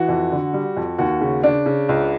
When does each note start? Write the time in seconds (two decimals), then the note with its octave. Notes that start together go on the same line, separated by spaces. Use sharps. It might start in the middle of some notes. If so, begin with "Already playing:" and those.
Already playing: E3 F#4
0.09 F2
0.32 D3
0.53 G3
0.77 F2
0.98 D#2 F#4
1.21 C#3
1.43 C#3 D4
1.66 C#3
1.89 C#2